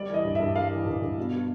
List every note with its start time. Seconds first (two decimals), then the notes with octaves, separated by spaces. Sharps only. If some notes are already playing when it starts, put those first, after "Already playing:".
Already playing: G3 D5
0.09 E3 D#5
0.25 G2
0.35 G2 E5
0.56 G3 F5
0.71 E3
0.86 G2
1.02 G2
1.18 B2
1.33 F#3